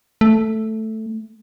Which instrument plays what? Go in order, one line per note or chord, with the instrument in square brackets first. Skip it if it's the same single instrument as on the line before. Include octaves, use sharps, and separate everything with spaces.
[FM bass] A3